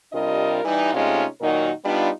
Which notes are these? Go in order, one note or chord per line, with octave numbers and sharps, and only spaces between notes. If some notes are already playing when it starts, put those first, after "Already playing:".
C3 G3 D4 F4 A#4 D#5
E3 G3 D#4
C3 G#3 A3 C#4 D#4 F4
A#2 D#3 F#3 D#4 F#4 A#4
G3 B3 D4 D#4 F4